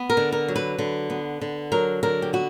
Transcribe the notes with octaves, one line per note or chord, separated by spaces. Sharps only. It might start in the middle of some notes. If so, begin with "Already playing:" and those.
Already playing: B3
A#4
D3
A#4
F#3
B4
D3
B3
D3
F#3 A#4
D3 A#4
G4
B3 F#4